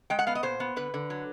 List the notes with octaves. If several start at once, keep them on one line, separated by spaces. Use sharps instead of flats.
G#3 G5
F#5
B3 F5
D#5
A#2 C5
B3
D3 B4
D3
F#3